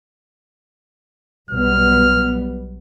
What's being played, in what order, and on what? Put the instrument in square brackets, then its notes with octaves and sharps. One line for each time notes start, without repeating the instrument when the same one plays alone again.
[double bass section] B1 G3 B3 [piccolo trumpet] F6